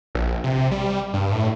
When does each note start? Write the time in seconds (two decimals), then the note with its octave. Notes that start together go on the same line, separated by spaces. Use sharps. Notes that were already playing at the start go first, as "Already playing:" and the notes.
0.15 A#1
0.44 C3
0.71 G3
1.13 G2
1.32 A2